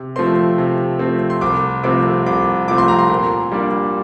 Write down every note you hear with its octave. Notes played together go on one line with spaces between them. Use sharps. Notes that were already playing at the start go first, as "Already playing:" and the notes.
Already playing: C3
F3 A3 C4 C6
C3
F3 A3 C4
C6
C2 D6
C3 F3 A3 C4 D6
C2 D6
C3 F3 A3 C4 D6
C6
A#5
C6
A#2
G3 A#3 D4